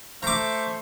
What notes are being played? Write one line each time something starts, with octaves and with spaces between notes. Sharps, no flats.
A3 C5 E5 A#5 C#6 D6